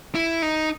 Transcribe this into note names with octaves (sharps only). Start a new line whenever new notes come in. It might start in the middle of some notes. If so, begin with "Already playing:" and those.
E4
D#4